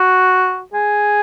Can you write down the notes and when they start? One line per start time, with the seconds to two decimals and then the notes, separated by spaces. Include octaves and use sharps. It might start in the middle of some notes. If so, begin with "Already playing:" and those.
Already playing: F#4
0.74 G#4